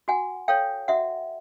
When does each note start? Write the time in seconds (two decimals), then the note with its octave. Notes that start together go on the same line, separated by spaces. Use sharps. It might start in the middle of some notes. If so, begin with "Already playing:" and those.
0.08 F#4 F#5 G#5
0.48 A4 C#5 F5 G5
0.88 F#4 E5 F#5